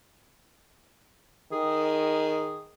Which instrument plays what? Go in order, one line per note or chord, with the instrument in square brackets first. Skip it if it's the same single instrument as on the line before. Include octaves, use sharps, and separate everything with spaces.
[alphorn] D#3 [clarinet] G#4